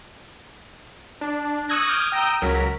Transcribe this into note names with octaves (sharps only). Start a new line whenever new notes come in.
D4
C#6 D#6 E6 F#6 G#6 A#6
D6 D#6 F6 G6 G#6 D7
G5 A#5 D#6 E6 G6
C#2 F#3 A#4 B6